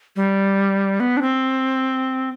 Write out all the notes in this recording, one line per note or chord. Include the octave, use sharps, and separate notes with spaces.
G3
B3
D4
C4